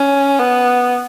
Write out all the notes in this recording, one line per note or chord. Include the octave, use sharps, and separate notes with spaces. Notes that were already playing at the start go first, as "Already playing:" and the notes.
Already playing: C#4
B3